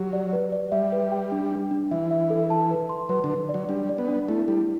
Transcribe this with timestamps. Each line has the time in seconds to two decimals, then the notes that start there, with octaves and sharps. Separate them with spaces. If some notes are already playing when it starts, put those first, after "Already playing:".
Already playing: F#3 G4
0.13 D5
0.33 B4
0.52 D5
0.72 G3 E5
0.92 B4
1.12 G5
1.32 D4
1.52 D4
1.71 D4
1.91 E3 E5
2.11 E5
2.30 A4
2.50 A5
2.71 B4
2.89 C6
3.09 F#3 B4
3.24 D3
3.30 B4
3.49 D5
3.54 F#3
3.69 G3 D4
3.89 D5
3.98 B3
4.08 D4
4.28 A3 E4
4.48 G3 E4